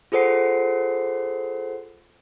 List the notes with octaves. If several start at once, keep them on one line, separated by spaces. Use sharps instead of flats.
F4 G#4 A4 C5 F#5 C7